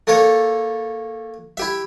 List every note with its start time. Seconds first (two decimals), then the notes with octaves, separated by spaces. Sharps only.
0.07 A3 A#3 A4 C#5
1.57 E4 G4 E5